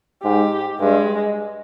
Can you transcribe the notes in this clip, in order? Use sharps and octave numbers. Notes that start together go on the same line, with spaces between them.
G#2 G4
G2 G#3